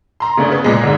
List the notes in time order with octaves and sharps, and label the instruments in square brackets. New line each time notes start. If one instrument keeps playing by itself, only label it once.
[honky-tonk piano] A#5 C6
C#3 A3 A#3 D4
C#3 B3
A#2 G#3
G#2 D3